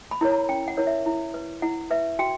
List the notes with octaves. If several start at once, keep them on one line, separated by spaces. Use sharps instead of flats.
B5
E4 A#4 C#5
A#5
C#4 G5
F#5
E4 A#4 C#5
E5
E4
B4
E4 F#5
B4 E5
F#4 G5